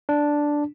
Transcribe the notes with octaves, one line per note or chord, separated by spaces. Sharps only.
D4